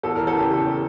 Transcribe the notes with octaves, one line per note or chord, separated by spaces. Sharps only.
E2 A4
E3 A#4
A4
C#3 G4
E2